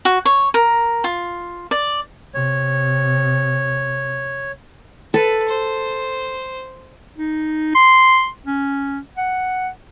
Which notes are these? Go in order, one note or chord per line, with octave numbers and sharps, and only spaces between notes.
F#4
C#5
A#4
F4
D5
C3 C#5
A4 B4
C5
D#4
C6
C#4
F#5